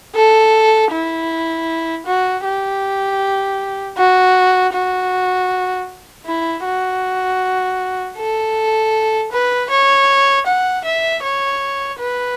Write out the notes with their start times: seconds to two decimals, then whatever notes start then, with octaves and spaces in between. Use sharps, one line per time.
0.15 A4
0.92 E4
2.06 F#4
2.45 G4
3.98 F#4
4.73 F#4
6.26 E4
6.65 F#4
8.17 A4
9.32 B4
9.70 C#5
10.46 F#5
10.85 E5
11.23 C#5
11.99 B4